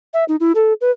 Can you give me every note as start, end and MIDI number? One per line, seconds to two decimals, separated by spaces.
0.14 0.24 76
0.28 0.36 63
0.40 0.52 64
0.55 0.73 69
0.81 0.91 71